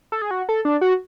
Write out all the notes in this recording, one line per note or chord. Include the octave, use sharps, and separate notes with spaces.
A4
G#4
F#4
A4
D4
F#4